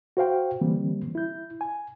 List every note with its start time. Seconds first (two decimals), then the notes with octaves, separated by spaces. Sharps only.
0.17 F#4 C5 F5 G5
0.61 D3 E3 G3 A#3 C4
1.15 E4 G6
1.61 G#5